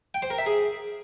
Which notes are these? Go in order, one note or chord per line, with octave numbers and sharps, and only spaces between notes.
G5
C5
A#4
E5
G#4